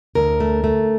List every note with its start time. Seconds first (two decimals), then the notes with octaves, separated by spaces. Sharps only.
0.15 D2 A#4
0.40 A3
0.64 A3